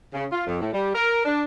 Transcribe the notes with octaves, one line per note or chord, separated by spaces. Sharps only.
C#3
F4
F2
A2
G3
A#4
D4